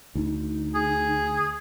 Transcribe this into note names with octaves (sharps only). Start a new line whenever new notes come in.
D2 D#4
G#4